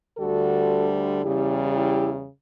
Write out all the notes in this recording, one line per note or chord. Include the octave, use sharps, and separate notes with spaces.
D2 D3 G3 F#4 A4
E2 C#3 G3 E4 G4
E4 G4